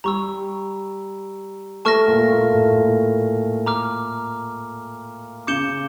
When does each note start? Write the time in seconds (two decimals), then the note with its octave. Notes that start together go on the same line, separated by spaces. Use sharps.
0.04 G3 A#5 C#6 E6
1.85 A3 A5 C#6 F6 A#6
2.08 A#2
2.31 A#2
2.53 A2
2.75 A#2
3.66 A#5 D6 F6
5.47 C#3 D6 G6 C#7 E7 G7